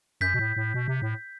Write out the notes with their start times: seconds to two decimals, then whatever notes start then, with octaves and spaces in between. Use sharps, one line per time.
0.21 F#2 G6 B6
0.34 B2
0.39 A2
0.56 A2
0.74 B2
0.88 C3
1.02 A2